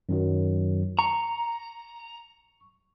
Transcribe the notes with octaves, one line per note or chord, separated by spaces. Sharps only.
F#2 D#3 F#3
A#5 C#6